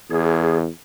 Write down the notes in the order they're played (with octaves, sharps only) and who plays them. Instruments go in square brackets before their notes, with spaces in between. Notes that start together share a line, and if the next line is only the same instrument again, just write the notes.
[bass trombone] E2 [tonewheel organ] G#4